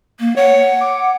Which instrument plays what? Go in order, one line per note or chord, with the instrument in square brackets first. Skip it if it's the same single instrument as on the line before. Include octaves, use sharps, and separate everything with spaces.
[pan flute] A#3
[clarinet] C#5 [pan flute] F#5
[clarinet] D6